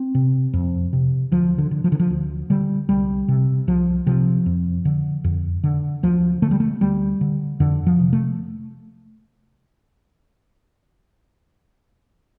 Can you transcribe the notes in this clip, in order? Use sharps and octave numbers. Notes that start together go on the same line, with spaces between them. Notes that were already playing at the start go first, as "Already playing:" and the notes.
Already playing: C4
C3
F2
C3
D2 F3
D3
D3
F3
D3
F3
D2
D3 G3
C2 G3
C3
C2 F3
C3 F3
F2
D3
F2
D3
D2 F3
D3 A3
G3
A3
D2 G3
D3
F2 D3
F3
C3
A3